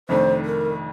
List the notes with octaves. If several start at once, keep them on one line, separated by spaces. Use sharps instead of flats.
F1 F2 D#3 A3 D4 C5
A#4